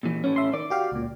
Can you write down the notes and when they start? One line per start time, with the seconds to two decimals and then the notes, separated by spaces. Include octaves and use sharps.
0.03 A#2 E3
0.24 A2 C#4
0.36 E5 C6
0.54 D#3 D5
0.70 F#4 G4 F5
0.92 C#2 A#2